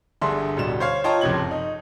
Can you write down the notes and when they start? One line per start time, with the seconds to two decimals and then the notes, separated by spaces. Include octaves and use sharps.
0.22 G1 G2 D3 G#4 E5 C6
0.57 D1 B2 G3 E7
0.80 C5 C#5 F5
1.04 F4 C#5 D#5 G5 A5 A#5
1.21 F#1 F2 A2 C3 G#6 F#7
1.51 D#4